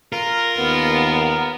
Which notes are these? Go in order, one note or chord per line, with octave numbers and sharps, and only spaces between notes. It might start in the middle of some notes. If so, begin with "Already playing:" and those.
F4 A#4
D#2 B3